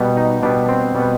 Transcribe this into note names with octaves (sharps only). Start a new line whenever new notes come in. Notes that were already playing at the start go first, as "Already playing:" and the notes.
Already playing: B2 G3 B3
D#4
B2 G3 B3 D4
C4
B2 G3 B3